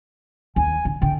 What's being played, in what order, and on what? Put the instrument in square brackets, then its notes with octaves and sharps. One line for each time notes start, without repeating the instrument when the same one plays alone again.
[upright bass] D#2 [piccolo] G#5
[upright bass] D3
[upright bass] D3 [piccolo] G5